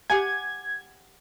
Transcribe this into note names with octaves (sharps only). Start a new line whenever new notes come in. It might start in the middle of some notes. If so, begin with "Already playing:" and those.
G4 F#5 G#5 G#6